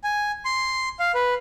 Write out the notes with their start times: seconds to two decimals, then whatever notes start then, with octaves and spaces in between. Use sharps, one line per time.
0.04 G#5
0.45 C6
0.99 F5
1.14 B4